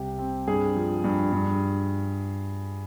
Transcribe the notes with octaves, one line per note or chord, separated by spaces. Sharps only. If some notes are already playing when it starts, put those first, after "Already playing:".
Already playing: C2 C3 G4
C4
G2 G#4
F3
G2
G2